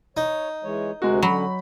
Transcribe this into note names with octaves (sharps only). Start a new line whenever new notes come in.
D#4 C#5
E3 G#3 C#5
D2 C3 G#3 F#4 A#4
D3 F#3 C#4 B5